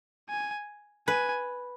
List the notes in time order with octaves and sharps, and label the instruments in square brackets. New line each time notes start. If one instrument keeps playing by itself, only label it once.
[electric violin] G#5
[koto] B4 [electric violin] G#5